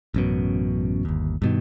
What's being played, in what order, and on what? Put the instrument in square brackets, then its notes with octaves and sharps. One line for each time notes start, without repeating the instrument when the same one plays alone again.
[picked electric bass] A1 F#2 B2
G1 D#2
G2 B2 D#3